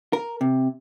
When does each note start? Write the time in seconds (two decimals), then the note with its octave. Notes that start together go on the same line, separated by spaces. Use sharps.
0.13 A#4
0.41 C3